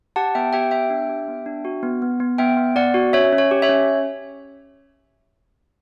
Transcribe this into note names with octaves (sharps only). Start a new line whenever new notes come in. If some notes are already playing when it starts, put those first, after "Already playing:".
G4 F#5 A5
B3 E5 G5
G4 E5 G5
B3 E5 G5
D4
G4
B3
D4
F#4
B3
B3
B3
B3 E5 G5
B3
B3 D5 F#5
F#4
C#4 C#5 E5
C#4
C#5
G4
C#5 E5
C#4